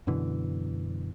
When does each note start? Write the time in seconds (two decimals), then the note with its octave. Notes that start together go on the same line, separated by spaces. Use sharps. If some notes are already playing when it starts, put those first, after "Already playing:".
0.07 F#2 B2 D3 E3